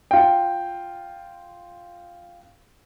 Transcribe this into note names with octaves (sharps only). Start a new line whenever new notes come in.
F4 G5